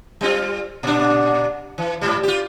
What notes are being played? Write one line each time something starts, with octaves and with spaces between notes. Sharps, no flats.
G3 C4 F4
A#2 D4
E3
G#2 G3
F4 G4